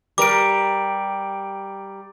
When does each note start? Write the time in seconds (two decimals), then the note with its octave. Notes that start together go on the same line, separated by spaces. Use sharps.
0.18 G3 A#4 D6 D7